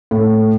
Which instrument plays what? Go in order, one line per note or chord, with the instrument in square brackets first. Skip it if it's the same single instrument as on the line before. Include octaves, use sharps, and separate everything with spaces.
[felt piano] A2